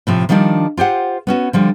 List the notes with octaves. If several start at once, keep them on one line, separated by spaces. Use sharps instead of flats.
A2 C3 F3
D#3 F3 G3 A#3 D4
F4 G4 C5 F#5
B3 C#4 F#4
D3 F3 G3